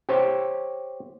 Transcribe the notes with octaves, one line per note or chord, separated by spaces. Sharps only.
G4 C5 C#5